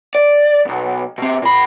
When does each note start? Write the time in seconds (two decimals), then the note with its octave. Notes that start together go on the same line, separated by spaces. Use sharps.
0.15 D5
0.65 B1 E2
1.18 B2 C4
1.42 A#2 B5